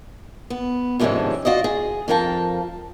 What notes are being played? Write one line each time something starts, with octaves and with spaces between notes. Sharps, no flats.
B3
F2 G#2 C3 D#3 C#4 D4
F4 F#4 D5 D#5
G#4
F2 F3 A#4 F5 G5 A5